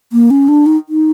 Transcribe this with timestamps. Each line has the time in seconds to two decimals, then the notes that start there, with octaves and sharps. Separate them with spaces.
0.13 A#3
0.30 C#4
0.48 D4
0.66 D#4
0.89 D#4